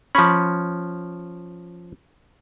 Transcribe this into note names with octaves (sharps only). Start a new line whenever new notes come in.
F3 C#4 B5 C#6 B6